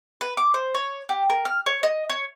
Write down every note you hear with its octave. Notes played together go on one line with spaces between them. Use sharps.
B4
D6
C5
C#5
G4
A#4
F6
C#5
D#5
C#5